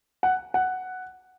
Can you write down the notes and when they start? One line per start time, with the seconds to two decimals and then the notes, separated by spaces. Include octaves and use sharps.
0.23 F#5
0.54 F#5